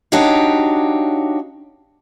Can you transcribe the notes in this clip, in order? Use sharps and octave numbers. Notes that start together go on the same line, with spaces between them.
D4 D#4 F#4 G4 C#5 F5